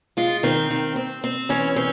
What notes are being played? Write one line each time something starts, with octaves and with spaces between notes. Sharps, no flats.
G#3 F4
D#3 C4
D#3
C4
C4
E3 C#4
C4 C#4